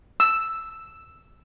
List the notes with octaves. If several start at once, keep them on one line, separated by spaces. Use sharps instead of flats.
E6